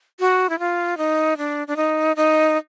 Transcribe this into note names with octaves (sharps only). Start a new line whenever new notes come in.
F#4
E4
F4
D#4
D4
D4
D#4
D#4